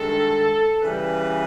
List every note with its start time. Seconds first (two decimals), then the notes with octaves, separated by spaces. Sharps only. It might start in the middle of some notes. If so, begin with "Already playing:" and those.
Already playing: G2 D#3 G#3 A4
0.82 C#3 E3 G3 B4